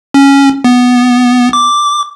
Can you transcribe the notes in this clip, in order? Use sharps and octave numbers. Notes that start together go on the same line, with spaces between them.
C#4
B3
D6